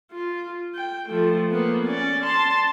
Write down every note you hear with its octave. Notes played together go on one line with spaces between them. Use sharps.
F4
G5
F3 A3
A#3 B3
C#4 D5
A5 C6